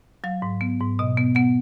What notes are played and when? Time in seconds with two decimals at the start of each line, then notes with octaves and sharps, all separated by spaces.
0.24 F#3 F5
0.42 G#2
0.61 B3
0.80 G#2
0.99 B2 D#5
1.17 B3
1.35 B3 F#5